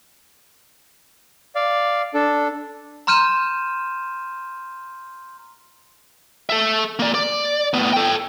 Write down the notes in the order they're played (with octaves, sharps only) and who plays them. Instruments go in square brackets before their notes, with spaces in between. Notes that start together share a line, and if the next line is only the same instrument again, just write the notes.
[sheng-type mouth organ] D5 F5
D4 A4
[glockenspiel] A#5 C6 F6 G6 D#7 E7
[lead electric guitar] A4 E5
A#3 D5
D5
A2 B3
A4 G5